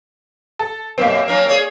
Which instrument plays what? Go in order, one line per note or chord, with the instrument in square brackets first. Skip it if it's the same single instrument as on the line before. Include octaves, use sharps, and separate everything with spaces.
[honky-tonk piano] A4
[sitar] F#2 B2 G4 [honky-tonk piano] A#3 C4
[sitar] F#3 C#4 A#4
G#4 C#5 D5